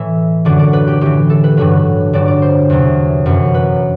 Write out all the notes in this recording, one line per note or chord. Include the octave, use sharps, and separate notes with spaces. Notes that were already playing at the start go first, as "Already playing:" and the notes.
Already playing: A2 E3 E5
F#2 D3 F#3 D5
D5
B4
G4
A2 E3 G4
A4
B4
G2 D3 F#3 B4
G2 F#3 D5
D5
C5
E2 C3 F#3
F#2 E3
B4